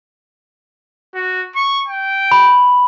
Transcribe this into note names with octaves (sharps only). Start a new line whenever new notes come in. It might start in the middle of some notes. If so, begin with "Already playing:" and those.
F#4
C#6
G5
B5